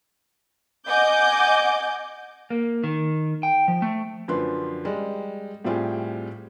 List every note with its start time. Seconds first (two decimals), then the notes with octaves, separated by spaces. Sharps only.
0.89 D#5 F#5 G#5 D6 G6
2.50 A#3
2.84 D#3
3.43 G5
3.68 F3
3.82 A3
4.28 F#2 D3 F3 B4 C6
4.85 G3 G#3
5.65 A2 G3 C4 F4 G4 G#4